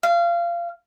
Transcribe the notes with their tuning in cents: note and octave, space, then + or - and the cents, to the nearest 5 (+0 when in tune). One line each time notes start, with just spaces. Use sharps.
F5 -25